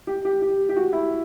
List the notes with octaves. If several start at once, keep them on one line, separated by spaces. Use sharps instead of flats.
G4
G4
G4
G4
F#4
E4